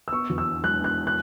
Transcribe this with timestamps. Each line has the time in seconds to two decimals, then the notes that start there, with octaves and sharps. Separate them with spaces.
0.08 E6
0.12 B3 C#6
0.30 E2
0.38 E6
0.47 B3
0.64 G#3 F#6
0.81 B3 F#6
1.07 F#6